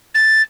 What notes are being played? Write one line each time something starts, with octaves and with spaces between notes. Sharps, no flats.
A6